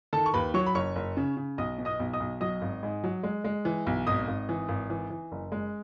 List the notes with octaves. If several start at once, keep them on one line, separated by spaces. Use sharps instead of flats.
D#3 A4 A5
C#6
D#2 B4 B5
F#3 C#5 C#6
B5
F#1 C#5 C#6
F#1
C#3
C#3
B1 D#5 D#6
B2
D#5 D#6
B1
D#5 D#6
B1
F#3 D#5 D#6
G#1
G#2
F#3
G#3
G#3
E3
B1
G#1 D#5 D#6
G#1
E3
G#1
E3
E3
F#1
G#3